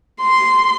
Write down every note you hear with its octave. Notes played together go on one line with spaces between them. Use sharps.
C6